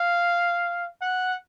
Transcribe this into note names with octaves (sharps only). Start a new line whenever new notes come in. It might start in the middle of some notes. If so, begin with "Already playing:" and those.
Already playing: F5
F#5